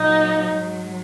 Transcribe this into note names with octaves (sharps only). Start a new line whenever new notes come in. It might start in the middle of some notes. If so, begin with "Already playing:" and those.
Already playing: A#2 F#3 D#4
G#2 F#3